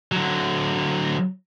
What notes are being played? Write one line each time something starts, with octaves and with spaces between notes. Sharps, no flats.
D3 F#3